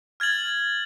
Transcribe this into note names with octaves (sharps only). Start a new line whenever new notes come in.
F6 G#6 A6 F#7